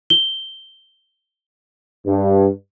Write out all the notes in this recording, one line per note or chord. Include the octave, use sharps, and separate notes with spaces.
G7
G2